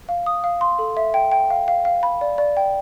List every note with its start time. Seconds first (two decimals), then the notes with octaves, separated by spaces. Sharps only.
0.09 F5
0.26 D#6
0.44 F5
0.61 C6
0.79 A4
0.97 E5
1.14 G5
1.32 G5
1.50 F5
1.68 F5
1.85 F5
2.03 B5
2.21 D5
2.38 D5
2.57 G5